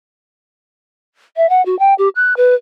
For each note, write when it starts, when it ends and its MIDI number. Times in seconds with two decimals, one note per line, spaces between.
1.37 1.49 76
1.49 1.64 78
1.66 1.78 66
1.79 1.94 79
1.98 2.09 67
2.16 2.36 90
2.37 2.55 71